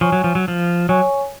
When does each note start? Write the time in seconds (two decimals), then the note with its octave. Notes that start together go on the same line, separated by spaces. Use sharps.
0.01 F3 C#5 G#5 C#6
0.12 F#3
0.24 F3
0.35 F#3
0.48 F3
0.89 F#3 C#5 G#5 C#6